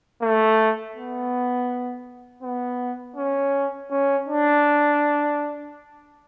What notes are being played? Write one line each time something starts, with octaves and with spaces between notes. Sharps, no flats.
A3
B3
B3
C#4
C#4
D4